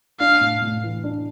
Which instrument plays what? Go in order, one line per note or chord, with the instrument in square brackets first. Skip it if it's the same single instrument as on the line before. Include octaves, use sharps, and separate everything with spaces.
[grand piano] D4 [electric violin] F5
[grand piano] A2
A2
E3
D4